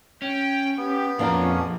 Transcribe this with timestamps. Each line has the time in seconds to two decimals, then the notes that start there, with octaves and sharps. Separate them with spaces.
0.22 C#4 G5
0.77 B3 G4
1.19 F2 A#2 F3 A#3 C#4 D4 A#4